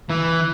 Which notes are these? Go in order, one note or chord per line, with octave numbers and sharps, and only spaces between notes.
E3